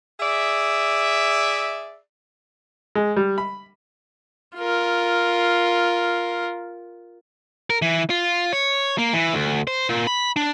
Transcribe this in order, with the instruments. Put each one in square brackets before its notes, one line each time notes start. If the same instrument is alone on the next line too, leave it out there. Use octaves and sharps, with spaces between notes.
[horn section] G#4 D5 E5
[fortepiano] G#3
G3
B5
[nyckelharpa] F4 A#4
[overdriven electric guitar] A#4
E3
F4
C#5
A#3
E3
D2
C5
A#2
B5
D4